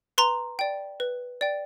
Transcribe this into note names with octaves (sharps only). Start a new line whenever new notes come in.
B4 A#5 C6
D5 G5
B4
D5 G5